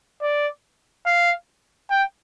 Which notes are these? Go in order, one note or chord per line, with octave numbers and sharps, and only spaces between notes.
D5
F5
G5